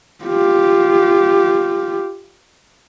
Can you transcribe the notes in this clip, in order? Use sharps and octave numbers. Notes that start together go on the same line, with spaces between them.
F4 G4